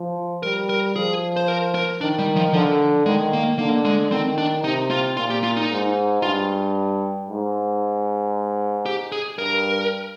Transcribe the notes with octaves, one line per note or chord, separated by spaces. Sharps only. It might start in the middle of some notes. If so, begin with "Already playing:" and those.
Already playing: F3
G3 A#4
A#4
F3 G#4
C5
A#4
A#4
D#3 D4
G3
F3
D3 F3
D#3 G#3
A#3
D3 A#3
G#3
D#3 C4
D4
C3 D#4
F4
A#2 F4
G4
F4
D#4
G#2
G2 F4
G#2
G4
G#4
G2 A#4